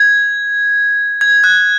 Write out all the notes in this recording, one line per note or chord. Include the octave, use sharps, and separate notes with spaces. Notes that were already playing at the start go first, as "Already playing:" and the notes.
Already playing: G#6
G#6
F#6